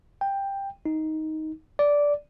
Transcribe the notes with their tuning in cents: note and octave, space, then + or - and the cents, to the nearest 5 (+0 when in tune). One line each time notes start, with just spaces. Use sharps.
G5 +10
D#4 +10
D5 -10